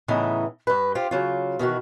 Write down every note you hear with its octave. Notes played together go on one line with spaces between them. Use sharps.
A2 C#3 E3 B3 D#4
G2 B4
F4 G4 C5
C#3 F#3 F4
B2 D#3 E3 F#4